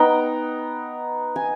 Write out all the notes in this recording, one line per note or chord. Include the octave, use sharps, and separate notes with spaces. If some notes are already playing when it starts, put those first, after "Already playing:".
Already playing: B3 D#4 G5
G#5